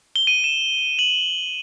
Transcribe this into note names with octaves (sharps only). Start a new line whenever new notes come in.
G7
D#7
E7
F#7